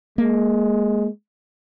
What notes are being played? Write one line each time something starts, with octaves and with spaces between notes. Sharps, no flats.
G#3 A#3